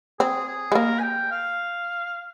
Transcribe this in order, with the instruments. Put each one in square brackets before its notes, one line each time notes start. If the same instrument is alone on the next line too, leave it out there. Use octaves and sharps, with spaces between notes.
[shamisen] C4 [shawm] G#4
[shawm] G#4
[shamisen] G#3
[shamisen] A#3 [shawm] A#4
[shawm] G#5
G5
F5